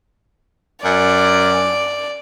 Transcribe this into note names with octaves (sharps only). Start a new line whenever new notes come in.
F#2 D5